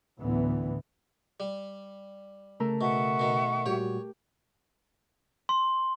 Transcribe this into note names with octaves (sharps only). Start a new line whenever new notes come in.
A1 D2 D3 E3 B3
G3
C#3 A3 A4 A#4
B2 E5 F#5 C#6
B2 D#3
A#2 G3 F#4 G4 C#5
C6